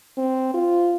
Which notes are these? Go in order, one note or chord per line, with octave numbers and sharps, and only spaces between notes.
C4
F4